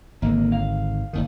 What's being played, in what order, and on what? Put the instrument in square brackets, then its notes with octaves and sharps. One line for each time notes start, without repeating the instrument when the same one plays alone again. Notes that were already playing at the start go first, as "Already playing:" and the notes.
[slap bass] G#1 D3 [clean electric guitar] A#3
[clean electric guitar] F5
[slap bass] F#1 D#2 D#3